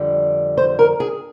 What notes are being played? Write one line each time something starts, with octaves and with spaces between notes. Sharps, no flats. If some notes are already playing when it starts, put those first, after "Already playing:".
Already playing: F2 D3 G3
C5
A#4
G#4